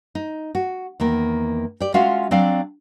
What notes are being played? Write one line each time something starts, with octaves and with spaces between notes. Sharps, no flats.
D#4
F#4
E2 D#3 A#3
G4 D5
G#3 C#4 F4 F#4 E5 F5
F#3 C4 D4 D5 F5